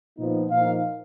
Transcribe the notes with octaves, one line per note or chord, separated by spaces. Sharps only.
A#2 F3 B3 D#4
A#2 F3 A#3 D#4 F5